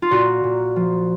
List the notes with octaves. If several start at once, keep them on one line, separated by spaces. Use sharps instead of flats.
F4
A#2 F#4
A#2
F3